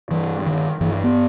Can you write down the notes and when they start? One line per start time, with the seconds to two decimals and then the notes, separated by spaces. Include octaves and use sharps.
0.11 G2 E3
0.46 D#3
0.81 G2 E3
1.04 B3